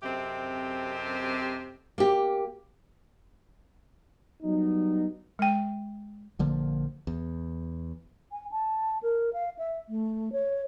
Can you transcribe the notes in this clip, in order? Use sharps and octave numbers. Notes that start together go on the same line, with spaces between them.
F#2 C3 C4 G4 A4 D#5
A#3 G4
F#3 G3 B3 D#4
G#3 G5
A#1 D3 F3 A#3
E2
G#5
A5
A#4
F5
E5
A3
C#5